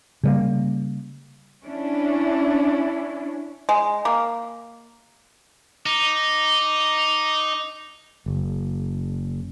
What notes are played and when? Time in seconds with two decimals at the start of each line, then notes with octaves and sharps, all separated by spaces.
0.23 C#3 G3 A#3
1.64 C#4 D4 E4
3.69 G#3
4.05 A#3
5.86 D#4 D6
8.26 F#1